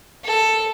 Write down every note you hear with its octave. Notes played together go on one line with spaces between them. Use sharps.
A4